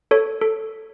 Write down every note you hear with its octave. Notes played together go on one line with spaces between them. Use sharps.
A4 C#5
A4